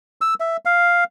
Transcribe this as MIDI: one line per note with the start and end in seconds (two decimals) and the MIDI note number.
0.21 0.34 88
0.40 0.57 76
0.65 1.04 77